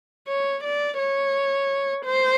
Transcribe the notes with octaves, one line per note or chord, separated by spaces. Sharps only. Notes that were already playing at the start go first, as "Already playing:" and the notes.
C#5
D5
C#5
C5